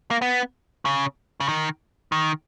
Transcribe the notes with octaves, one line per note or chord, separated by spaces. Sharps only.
A#3
B3
C#3
C#3
D#3
D#3